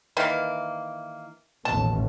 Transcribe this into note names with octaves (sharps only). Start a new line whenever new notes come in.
D#3 E3 A#3
A1 D#2 B2 A5